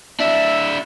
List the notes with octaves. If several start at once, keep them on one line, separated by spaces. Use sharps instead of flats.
D4 E4 E5